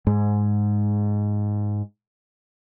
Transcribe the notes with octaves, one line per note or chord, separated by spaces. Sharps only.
G#2 G#3